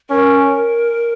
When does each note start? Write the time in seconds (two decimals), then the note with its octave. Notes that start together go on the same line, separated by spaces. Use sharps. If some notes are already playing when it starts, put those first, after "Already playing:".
0.10 C#4 A#4